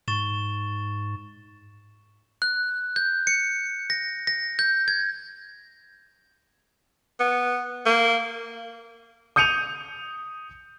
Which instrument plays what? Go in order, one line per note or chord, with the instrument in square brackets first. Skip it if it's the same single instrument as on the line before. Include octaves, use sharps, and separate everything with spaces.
[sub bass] G#2 [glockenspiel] C#6 A6 E7
[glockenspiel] F#6
G6
C#7
A#6
A#6
G6
G#6
[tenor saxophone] B3
A#3
[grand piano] D#6 G6 C#7 D#7 F7